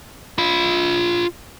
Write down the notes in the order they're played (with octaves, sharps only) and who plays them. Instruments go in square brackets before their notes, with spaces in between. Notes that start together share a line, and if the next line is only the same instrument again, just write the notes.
[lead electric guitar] F4 B5